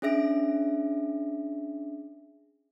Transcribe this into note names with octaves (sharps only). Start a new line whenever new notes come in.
C#4 D4 G#4 E5 A#6 D7